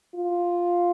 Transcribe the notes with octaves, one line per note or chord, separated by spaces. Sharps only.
F4